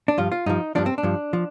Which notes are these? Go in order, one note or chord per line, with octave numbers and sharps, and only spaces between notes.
D4
G2 F3 F4
F4
G2 F3 D#4
G2 F3 D4
C4
D4
G2 F3
F3